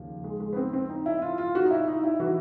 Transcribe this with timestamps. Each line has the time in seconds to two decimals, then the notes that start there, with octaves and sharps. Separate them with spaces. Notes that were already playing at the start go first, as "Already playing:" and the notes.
Already playing: D#2 C#3 F3
0.24 G#3
0.40 G#3
0.53 B3
0.56 C4
0.73 C4
0.89 D#4
1.06 E4
1.22 F4
1.38 F4
1.55 F#4
1.65 D#4
1.71 E4
1.88 D#4
2.04 E4
2.20 E3 F#4